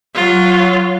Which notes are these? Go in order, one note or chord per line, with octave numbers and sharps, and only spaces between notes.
F#3 F4